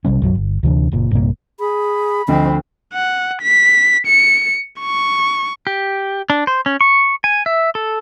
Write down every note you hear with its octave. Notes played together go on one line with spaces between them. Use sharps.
B1 C3 G3 C#4
B1 F#2 F#3
G1
D2 C3 E3 D4
F#1 A#2
A#1 G2 C3 A#3
G#4 B5
D2 F3 C4 D#5
F#5
B6
C#7
C#6
G4
D4
C5
C#4
C#6
G#5
E5
A4